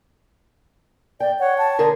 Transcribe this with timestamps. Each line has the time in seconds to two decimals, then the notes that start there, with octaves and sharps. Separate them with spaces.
1.20 D5 G5
1.39 C#5 F#5
1.58 A5
1.79 D3 G#4 A#4